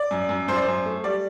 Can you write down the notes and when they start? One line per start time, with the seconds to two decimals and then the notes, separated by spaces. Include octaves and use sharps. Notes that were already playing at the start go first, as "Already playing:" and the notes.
Already playing: D5
0.11 F#2
0.29 F#2
0.48 F#2 C5
0.55 D5
0.62 F#2 C5
0.86 A3
1.04 G3 D5